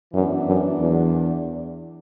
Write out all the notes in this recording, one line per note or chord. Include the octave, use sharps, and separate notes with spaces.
F#2 E3 B3 D4
F#2
E2